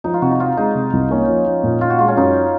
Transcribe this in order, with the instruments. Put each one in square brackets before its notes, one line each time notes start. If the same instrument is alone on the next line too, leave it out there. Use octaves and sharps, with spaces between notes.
[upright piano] F3 [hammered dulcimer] D#4
[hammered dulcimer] F4
[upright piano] C3 [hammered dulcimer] F#4
[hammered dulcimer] D#4
[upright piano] C4 [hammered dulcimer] F4
[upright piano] G#3 [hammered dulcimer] D#4
[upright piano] C3
C2
[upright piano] A#3 [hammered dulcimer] C#4
[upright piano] F3
F3
A#2
[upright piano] A#2 [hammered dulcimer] F4
[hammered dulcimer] F#4
[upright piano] G#3 [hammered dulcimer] F4
[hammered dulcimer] C#4
[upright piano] F#2 [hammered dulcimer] D#4